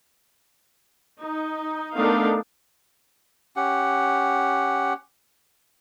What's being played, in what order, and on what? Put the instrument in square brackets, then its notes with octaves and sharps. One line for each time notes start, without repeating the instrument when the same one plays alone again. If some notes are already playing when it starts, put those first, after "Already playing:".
[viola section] D#4
A3 B3 D4 D#4 A#4 F5
[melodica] C#4 G4 F#5